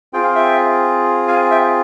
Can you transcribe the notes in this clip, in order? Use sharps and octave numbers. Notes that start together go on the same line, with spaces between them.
C4 F4 G#4 G5
F5
E5 G5
F5 G#5
E5 G5